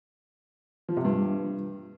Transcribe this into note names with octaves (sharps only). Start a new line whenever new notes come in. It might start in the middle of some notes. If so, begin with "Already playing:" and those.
F3
C3
G2